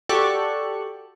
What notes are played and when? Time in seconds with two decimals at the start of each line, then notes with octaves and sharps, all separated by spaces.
0.09 F#4 G4 A4 D5 C#6 F#6